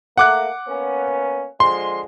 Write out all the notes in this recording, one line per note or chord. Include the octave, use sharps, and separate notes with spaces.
A3 A#3 F#5 D6 F#6
A#3 B3 C#4
D3 F3 G#3 C6